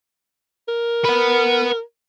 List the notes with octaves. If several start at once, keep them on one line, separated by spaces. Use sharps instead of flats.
A#4
B4 F#5